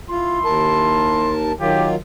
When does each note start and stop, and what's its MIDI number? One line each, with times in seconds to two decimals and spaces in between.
0.10 1.33 64
0.10 0.39 65
0.10 1.33 84
0.45 1.52 39
0.45 1.52 70
0.45 1.52 81
1.61 1.95 51
1.61 1.95 54
1.61 1.95 65
1.61 1.87 67